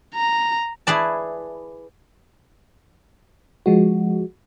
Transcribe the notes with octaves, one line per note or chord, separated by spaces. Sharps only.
A#5
E4 G#4 B4 D5 A5
F3 G#3 F#4